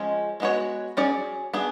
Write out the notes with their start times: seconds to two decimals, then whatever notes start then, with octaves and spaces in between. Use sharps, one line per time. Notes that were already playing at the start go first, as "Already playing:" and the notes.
Already playing: F3 G#3 C#4
0.40 G#3 B3 F#4 C#5
0.97 F#3 C#4 G#4 D5
1.54 B3 D4 G#4